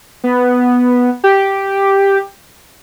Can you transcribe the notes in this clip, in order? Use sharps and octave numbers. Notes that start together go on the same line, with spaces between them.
B3
G4